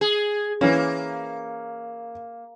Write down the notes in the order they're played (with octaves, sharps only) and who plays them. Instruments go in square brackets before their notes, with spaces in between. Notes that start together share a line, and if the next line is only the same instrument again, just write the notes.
[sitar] G#4
[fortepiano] E3 C#4 [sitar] A#3